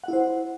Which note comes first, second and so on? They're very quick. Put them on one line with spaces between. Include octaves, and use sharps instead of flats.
F#5 E4 C5